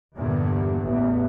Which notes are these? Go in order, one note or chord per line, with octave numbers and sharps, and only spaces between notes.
E2 G2 A#2 D3
A1 E2